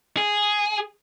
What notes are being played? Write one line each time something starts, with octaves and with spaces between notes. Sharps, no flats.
G#4